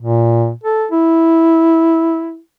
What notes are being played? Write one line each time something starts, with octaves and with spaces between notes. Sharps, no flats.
A#2
A4
E4